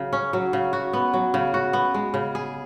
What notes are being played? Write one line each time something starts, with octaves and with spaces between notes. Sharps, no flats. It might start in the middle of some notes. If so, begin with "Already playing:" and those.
Already playing: C#3 F#3
C#4
F#3
C#3
F#4
B3
F#3
C#3
F#4
B3
G#3
C#3
G#4